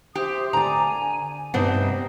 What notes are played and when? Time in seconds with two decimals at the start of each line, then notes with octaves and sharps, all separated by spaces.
0.15 G4 C5 E5 D#6
0.53 D3 D5 G#5 A#5
1.54 G2 C3 G3 B3 D#4 C5